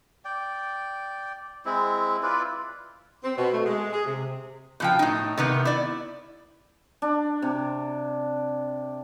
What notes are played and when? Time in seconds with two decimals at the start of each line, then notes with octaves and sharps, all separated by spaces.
0.25 D5 G5
1.65 G#3 C4 E4
2.23 E4 F4 B4 D5
3.23 C4
3.37 B2
3.53 A3
3.66 G#3
3.93 G#4
4.05 C3
4.80 B2 F3 G5
4.99 A2 D#4
5.37 C3 D#3 B3
5.65 E4 D5
7.02 D4
7.42 C3